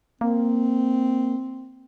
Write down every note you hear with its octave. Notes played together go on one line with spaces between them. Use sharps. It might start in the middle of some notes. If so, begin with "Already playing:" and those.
A#3 C4